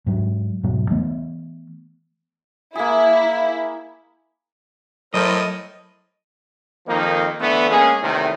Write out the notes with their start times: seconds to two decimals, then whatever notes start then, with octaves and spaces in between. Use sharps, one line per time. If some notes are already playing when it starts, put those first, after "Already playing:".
0.06 G#2 F#3
0.63 E1 G#2 B2 F#3
0.90 E3 A3 B3
2.75 A#3 E4 G#4
5.14 A2 F#3 A4 A#4 C5 D#5
6.87 F2 D#3 F3 A#3 D#4
7.40 D3 E3 A3 B3
7.70 G#3 A#3 C#4 G#4
8.02 E2 A2 C3 D#3